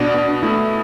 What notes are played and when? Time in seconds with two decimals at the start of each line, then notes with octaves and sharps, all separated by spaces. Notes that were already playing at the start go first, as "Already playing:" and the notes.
Already playing: B2 B3 D4
0.14 B2
0.43 A3 E4